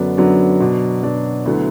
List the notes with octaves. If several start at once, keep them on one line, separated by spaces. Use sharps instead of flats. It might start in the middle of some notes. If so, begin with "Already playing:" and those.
Already playing: F#2 D3 F#3 B3 D4
F#2 D3 F#3 B3 D4
B2 F#3 D4
B2 F#3 D4
D2 D3 F#3 B3 E4